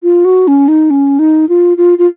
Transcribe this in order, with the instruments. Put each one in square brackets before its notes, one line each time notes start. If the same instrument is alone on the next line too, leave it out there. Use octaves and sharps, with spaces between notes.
[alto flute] F4
F#4
C#4
D#4
C#4
D#4
F4
F4
F4